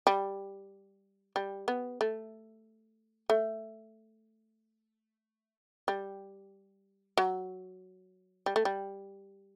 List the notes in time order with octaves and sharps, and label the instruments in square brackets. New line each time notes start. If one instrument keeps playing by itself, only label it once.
[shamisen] G3
G3
B3
A3
A3
G3
F#3
G3
A3
G3